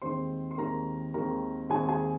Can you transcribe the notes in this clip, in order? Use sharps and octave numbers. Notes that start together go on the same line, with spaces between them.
D#2 D#3 G#3 C4 C5 C6
C6
D#2 D#3 G#3 C4 A#4 A#5
D#2 D#3 G#3 C4 A#4 A#5
D#2 D#3 G#3 C4 G#4 G#5
G#4 G#5